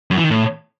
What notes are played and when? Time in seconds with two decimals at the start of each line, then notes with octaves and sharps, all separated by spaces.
0.11 F#2
0.17 E3
0.24 D#3
0.31 A2